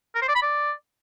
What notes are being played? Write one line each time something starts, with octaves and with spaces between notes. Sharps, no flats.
A#4
C5
D5
B5
D5